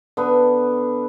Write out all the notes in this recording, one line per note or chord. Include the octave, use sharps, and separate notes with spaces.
D3 B3